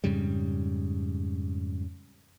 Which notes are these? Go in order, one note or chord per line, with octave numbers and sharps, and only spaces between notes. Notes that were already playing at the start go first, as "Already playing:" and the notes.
F2 G#2 C#3 G3